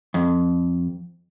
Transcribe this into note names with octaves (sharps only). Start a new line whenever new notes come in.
F2